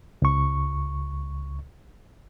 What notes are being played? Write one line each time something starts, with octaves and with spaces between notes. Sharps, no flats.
C#2 C#6